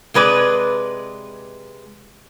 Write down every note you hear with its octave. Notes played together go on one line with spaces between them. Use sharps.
C3 G#3 B4 D5